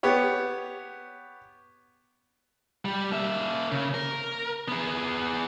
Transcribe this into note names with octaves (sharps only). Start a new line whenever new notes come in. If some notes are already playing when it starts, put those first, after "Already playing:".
B3 G4 C#5
G3
A#3 E5
C#3
A#4
B3 G#4